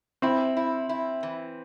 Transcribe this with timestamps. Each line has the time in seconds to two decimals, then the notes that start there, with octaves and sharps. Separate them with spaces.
0.22 C4 E4
0.57 E4
0.89 E4
1.23 E3